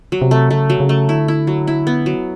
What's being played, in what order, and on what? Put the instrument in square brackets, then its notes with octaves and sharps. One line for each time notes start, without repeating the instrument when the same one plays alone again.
[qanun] F#3
[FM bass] C3
[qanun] A3
[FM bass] C#3 [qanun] A3
[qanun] F#3
[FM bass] C#3
[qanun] A3
[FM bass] D3 [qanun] E4
[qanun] E4
F#3
E4
B3
F#3